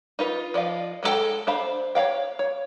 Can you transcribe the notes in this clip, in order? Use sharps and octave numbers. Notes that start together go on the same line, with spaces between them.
D#4 F4 B4
F3 D5 D#5 F5
F#3 G#3 A#3 A4 G5
D4 C5 F5 B5
C#5 D5 F5 G5
C#5